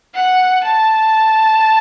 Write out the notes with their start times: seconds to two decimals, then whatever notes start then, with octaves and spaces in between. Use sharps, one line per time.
0.15 F#5
0.64 A5